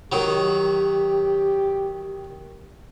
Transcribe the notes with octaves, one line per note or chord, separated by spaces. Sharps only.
D#3 F#3 G4